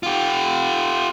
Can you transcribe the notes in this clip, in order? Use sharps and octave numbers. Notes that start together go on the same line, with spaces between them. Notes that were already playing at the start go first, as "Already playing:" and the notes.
F4 G4